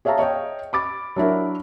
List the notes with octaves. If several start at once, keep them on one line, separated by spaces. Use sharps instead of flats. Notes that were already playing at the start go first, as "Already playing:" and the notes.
G#4 C#5 E5 F5 A5 A#5
C#5 D#5 F5 G5
B5 D6 A6
F#3 D4 E4 A#4